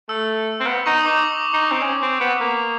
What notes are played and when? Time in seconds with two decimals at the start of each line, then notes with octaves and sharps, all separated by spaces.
0.09 A3 E6
0.60 C4
0.67 B3
0.86 D#4 C#6
0.98 D#6
1.06 D#4 D6
1.25 C#6
1.54 D#4
1.71 C4
1.82 C#4
2.02 C4
2.21 B3
2.41 A#3